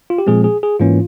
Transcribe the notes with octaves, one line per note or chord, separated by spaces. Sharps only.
F4
G4
A#2 F3 G#3 C4 G#4
G#4
G#4
G#2 E3 A#3 C#4 F4